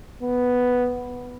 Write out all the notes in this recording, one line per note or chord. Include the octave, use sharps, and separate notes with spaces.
B3